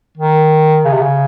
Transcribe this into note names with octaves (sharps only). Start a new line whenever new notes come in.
D#3
C#3
C3
C#3